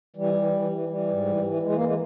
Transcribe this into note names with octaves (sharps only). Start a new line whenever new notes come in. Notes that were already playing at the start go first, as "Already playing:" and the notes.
E3 G3
E3
E3
E3
E3 G3
G#2
E3
E3
E3 G#3
A#3
E3 G#3